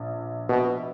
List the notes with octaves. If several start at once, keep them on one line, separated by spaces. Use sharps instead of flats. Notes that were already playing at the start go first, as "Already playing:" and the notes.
Already playing: A#1
B2